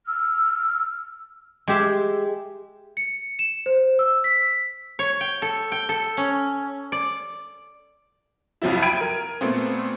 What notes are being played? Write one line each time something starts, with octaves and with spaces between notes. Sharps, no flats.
E6 F6
G#3 G4 E5
C#7
E7
C5
E6
B6
C#5
G5
A4
G5
A4
C#4
D5
C2 F2 F3 F#3 E4
E5 G5 B5 G#6 D7 D#7
A#4
A#2 A3 B3 C4